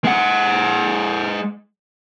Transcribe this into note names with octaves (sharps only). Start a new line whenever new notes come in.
G#3 F#5